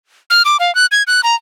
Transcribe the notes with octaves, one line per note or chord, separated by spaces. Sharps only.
F6
D6
F5
F#6
G#6
F#6
A#5